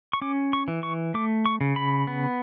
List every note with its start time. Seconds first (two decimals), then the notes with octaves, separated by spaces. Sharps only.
0.13 C#6
0.22 C#4 D6
0.53 C#6
0.68 E3
0.83 C#6
1.14 A3 D6
1.46 C#6
1.61 C#3
1.76 B5
2.07 B3